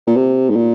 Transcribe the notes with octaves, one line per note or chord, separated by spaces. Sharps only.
A#2
C3
G#2
A#2